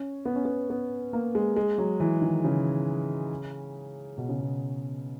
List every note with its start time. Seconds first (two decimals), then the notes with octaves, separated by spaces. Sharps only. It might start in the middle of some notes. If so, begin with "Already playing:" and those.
Already playing: C#4
0.25 B3
0.36 C#4
0.45 B3
0.70 B3
1.13 A#3
1.35 G#3
1.56 G#3
1.78 F#3
2.00 E3
2.22 D#3
2.44 C#3
4.18 B2
4.29 C#3
4.40 B2